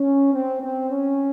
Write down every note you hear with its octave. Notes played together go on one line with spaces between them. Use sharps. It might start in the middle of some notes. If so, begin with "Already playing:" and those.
Already playing: C#4
C4
C4
C#4